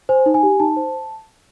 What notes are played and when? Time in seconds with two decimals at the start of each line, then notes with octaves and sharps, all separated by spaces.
0.09 C5 G#5
0.26 D#4
0.34 G#5
0.43 G4
0.60 D#4 A5
0.76 C5